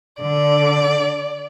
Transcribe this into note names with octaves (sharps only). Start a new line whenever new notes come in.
D3 D5